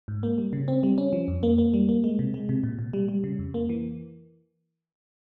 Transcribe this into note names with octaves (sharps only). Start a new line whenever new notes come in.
G#2
A#3
G3
C#3
C4
G3
C#4
F3
F2
A#3
A#3
G3
A#3
G#3
C3
G#3
C3
A#2
A#2
G3
G3
C#3
F2
A#3
E3